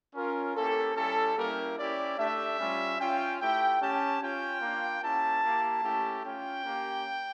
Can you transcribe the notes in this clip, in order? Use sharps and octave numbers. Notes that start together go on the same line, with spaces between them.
C#4 F4 A#4
A#3 C#4 E4 G4 A4
G3 C#4 E4 G4 A4
G3 A#3 C#4 E4 G4 A#4
C#4 E4 G4 D5
A3 D4 G4 E5
G3 C#4 F4
C#4 F4 G5
A3 E4 G4 G5
C#4 G4 A5
C#4 F4 G5
A#3 D4 F4
A#3 C#4 E4 G4 A5
A#3 E4 G4
A3 C#4 E4 G4
C#4 F4 G5
A#3 C#4 G4